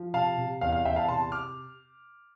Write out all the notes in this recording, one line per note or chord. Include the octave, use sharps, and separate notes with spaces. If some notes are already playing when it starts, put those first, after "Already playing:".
Already playing: F3
C3 F5 A5
C3
E2 F5
F5
E2 E5 G5
F5 A5
C3 A5 C6
D6 F6